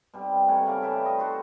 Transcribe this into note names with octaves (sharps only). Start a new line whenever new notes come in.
B2 G3 C4
A3 A#3 F#5 G#5
C#3 F5 D6
G4 B4 D5 E5
F4 D#5
F#4 A4 C5 C6